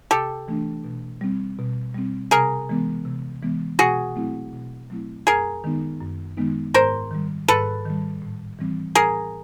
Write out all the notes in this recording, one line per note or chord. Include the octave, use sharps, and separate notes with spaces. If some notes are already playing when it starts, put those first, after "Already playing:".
C3 G4 A4
E3 A3 D4
B2
G3 C4
B2
G3 C4
C3 G#4 A#4
E3 G#3 B3
C3
E3 G#3 B3
B2 F#4 G#4
F#3 A3 C4 E4
B2
F#3 A3 C4 E4
F#2 G#4 A#4
D#3 G#3 B3 D#4
F#2
D#3 G#3 B3 D#4
G#2 A#4 C5
D#3 G3
G#2 A4 B4
D#3 G3
A2
E3 G3 C4
A2 G#4 A#4